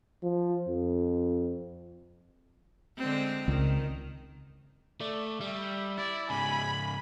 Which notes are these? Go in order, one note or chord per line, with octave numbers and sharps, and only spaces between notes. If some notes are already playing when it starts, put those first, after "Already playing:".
F3
F2
D3 G#3 C4
C#2 D#3
A3 D5
G3 E5
E4 D5
G#2 C#3 G#5 B5